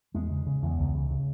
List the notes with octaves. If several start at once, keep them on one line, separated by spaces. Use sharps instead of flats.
E2 G#3
C#3
C#3
E2
C#2
C#3
C#3